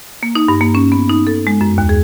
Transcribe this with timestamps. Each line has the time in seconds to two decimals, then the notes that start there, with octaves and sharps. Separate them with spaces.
0.23 A#3
0.35 D#4
0.48 G2
0.61 A#3
0.75 C#4
0.92 B3
1.09 D#4
1.27 A4
1.47 G#3
1.61 F#2
1.78 D#2
1.89 G#4